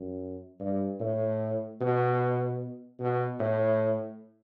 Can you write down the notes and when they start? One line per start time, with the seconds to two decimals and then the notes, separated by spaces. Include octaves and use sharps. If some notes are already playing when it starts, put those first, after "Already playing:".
Already playing: F#2
0.60 G2
1.00 A2
1.81 B2
3.00 B2
3.40 A2